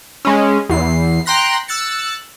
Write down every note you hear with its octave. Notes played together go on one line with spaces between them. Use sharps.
G#3 C#4
E2 C7
G5 A#5 C6 F#6 A#6 B6
E6 F#6 A6 C#7